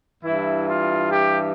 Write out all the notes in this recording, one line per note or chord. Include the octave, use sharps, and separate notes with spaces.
G2 E3 E4
F4
G4